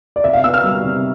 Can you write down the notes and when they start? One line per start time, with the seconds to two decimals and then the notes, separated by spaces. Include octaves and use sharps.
0.16 D5
0.23 C3 E5
0.33 F5
0.44 B3 E6
0.54 F6
0.64 G3
0.84 C3